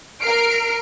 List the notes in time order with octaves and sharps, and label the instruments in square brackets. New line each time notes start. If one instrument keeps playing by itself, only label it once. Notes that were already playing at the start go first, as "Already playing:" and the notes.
[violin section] A#4 F6 C7 D7